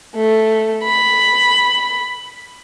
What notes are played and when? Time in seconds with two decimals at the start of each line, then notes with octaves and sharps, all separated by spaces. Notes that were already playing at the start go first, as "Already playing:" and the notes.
0.15 A3
0.84 B5